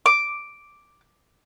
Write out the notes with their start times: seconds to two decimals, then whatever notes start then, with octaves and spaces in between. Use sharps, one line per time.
0.06 D6